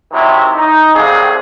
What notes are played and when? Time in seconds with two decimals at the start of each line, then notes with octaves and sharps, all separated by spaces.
0.12 C3 D#3 F#3 E4
0.55 D#4
0.94 C2 F2 C3 F#3 G3 G#4